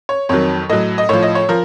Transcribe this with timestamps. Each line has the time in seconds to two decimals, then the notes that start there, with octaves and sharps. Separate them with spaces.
0.09 C#5
0.29 F2 D#3 F#3 C#5
0.69 A2 F#3 D#5
0.98 D#5
1.09 A2 F3 C#5
1.23 D#5
1.35 C#5
1.49 F3 A#4